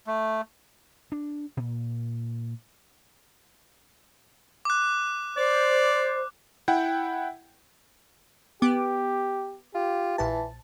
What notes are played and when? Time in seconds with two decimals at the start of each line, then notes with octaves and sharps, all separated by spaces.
0.07 A3
1.12 D4
1.57 A#2
4.65 D6 F#6
5.37 C5 D5
6.68 E4 F#5 G5
8.62 B3 G4 D6
9.75 F4 G4
10.18 A#1 E3 A5